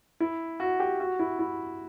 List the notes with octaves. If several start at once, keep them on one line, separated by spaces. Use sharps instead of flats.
E4
F#4
G4
F#4
E4
E4